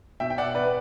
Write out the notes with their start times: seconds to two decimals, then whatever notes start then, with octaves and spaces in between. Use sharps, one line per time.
0.20 B2 E5 G5
0.30 G5
0.38 D5 F#5
0.55 B4 D5